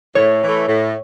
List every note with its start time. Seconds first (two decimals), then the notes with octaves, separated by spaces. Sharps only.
0.15 A2 C#5
0.42 E3 A3
0.67 A2